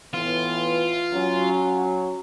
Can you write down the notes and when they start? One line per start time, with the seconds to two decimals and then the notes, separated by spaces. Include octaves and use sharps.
0.14 A2 E3 B3 F4
1.13 F#3 C#4